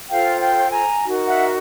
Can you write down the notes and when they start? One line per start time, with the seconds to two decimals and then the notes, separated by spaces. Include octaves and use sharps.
0.09 F4 A4 C5 F5 G5
0.41 F5 G5
0.72 G#5 A#5
1.03 D#4 F#4 A#4
1.27 E5 F#5